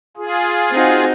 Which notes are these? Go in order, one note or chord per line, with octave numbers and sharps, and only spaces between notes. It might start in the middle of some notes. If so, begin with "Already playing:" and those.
F4 G#4
C4 D#4 F#4